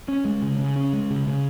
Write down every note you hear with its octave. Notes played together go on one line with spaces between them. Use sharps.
C#4
G#3
C#3
C#3
C#4
G#3
C#3
C#3